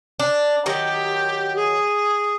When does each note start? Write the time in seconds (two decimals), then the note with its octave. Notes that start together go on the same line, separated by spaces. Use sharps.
0.19 D4
0.66 D#3 F#3 G4
1.56 G#4